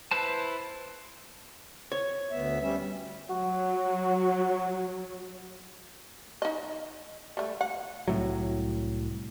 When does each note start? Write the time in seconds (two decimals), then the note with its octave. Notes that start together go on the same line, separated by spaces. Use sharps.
0.11 E4 B4 C5 A5
1.92 C#5
2.31 D2 B3 E5
2.62 G3 C#4 E5
3.30 F#3 F#4
6.42 D#4 D#5
7.37 G3 A3
7.61 F#5
8.08 C2 A2 F#3